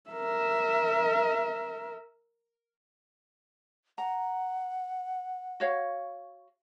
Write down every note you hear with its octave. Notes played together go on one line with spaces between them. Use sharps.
A#4 E5
F#5 A#5
F#4 C#5 F5